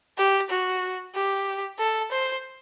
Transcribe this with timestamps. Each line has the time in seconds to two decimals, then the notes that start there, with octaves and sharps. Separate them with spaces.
0.18 G4
0.50 F#4
1.15 G4
1.79 A4
2.11 C5